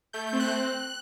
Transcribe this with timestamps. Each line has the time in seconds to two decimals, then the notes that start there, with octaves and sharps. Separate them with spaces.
0.13 A3 G6
0.27 G6
0.33 C4
0.39 F#6